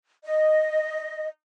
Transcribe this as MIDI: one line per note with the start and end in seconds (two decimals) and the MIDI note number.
0.24 1.27 75